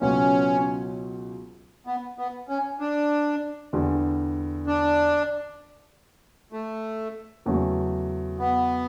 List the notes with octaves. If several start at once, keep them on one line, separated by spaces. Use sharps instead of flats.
C#2 B2 F#3 B3 C#4
B3
B3
C#4
D4
E2 D3 G3
D4
A3
E2 C#3 F#3 A3
B3